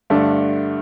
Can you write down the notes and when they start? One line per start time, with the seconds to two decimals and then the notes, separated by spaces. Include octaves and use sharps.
0.10 G2 D3 A3 D4 A4